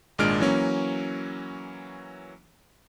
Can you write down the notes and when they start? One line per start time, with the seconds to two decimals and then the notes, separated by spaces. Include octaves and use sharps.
0.18 G#1 A#2 G#3 D4 F6 D7
0.40 E3 F#3 A#3 C#4